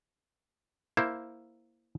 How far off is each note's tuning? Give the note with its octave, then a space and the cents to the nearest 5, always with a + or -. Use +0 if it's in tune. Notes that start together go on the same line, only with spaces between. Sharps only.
A#3 +0 E4 +0 C5 +10